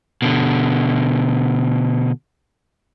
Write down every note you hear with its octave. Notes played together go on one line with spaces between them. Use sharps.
B2 D3